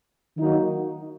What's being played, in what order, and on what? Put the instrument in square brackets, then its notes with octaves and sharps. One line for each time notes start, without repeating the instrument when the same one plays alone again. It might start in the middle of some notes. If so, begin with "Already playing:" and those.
[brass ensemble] D#3 F#3 A#3 D#4 F#4